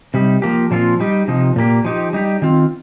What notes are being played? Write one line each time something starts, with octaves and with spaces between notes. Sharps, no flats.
C3 G3 D#4 G4
F3 A#3 G4
A#2 F3 C4 F4
G3 D#4 G4
C3 F3 D#4
A#2 A#3 G4
F3 D#4 G4
G3 D#4 G4
D#3 C4 F4